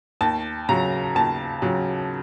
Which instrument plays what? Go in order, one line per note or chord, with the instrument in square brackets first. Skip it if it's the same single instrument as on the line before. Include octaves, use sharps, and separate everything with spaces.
[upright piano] D#2 A5
C#3 F#3 A#5
D#2 A5
C#3 F#3